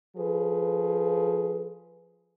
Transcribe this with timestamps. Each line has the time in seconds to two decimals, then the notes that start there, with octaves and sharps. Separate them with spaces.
0.17 F3 G#4 A4 B4